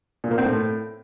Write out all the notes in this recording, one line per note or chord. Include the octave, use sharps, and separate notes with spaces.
A#2
A#3
C4
A2